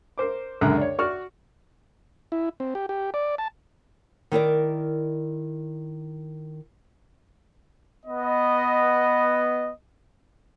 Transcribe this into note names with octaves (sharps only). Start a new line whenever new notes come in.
A#4 C5 D6
C#2 F#2 D3 E5 A#5 F#6
C#5 D5
F#4 D5 C#6 F6
E4
C4
G4
G4
D5
A5
D#3 E4 A#4 D5
B3 D#5